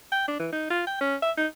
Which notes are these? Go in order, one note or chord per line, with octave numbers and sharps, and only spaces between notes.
G5
D4
E3
D#4
F4
G5
C#4
E5
D#4